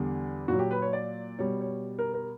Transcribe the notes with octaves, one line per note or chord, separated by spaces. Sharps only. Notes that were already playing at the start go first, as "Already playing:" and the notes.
Already playing: E2 D3 G3
A#2 F#3 F#4
G4
B4
C#5
D5
B2 G3 C#5
C#5
A#4
A#4